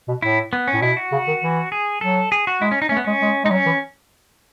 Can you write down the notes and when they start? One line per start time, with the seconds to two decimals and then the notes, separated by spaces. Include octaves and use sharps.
0.08 B2
0.22 A2 E4
0.53 B3
0.68 C#4
0.74 A2
0.82 B2 E4
0.97 F#4
1.12 C#3
1.27 D#3
1.42 E3
1.72 G#4
2.01 F#3 A4
2.32 G#4
2.47 F#4
2.62 G#3 E4
2.71 C#4
2.82 D#4
2.89 A3 C#4
2.97 B3
3.04 G#3 C#4
3.22 G#3
3.44 G#3 D#4
3.51 F#3 C#4
3.66 E3